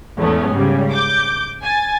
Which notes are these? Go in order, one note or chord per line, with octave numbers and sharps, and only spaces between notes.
E2 G#2 A3 B3 C#4
G#2 C#3 G3
D6 G6
G#5 A6